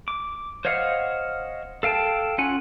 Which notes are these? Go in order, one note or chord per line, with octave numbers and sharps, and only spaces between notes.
D6
C5 C#5 D#5 F5 F#5
A4 F5 G5 A5
C#4 F4 F#5 G#5